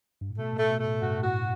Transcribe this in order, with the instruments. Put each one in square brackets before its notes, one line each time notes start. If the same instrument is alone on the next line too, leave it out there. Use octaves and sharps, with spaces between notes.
[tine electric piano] G2
A2
[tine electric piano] B2 [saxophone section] A3
[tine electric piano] A2
[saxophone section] A3
[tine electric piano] B2
[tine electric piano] A2 [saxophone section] A3
[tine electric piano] G2 [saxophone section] F#4
[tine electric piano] A2 [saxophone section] F#4